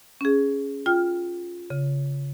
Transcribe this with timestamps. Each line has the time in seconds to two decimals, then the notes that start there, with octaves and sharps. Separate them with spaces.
0.21 C#4 G#4
0.86 F4 G5 F6
1.70 C#3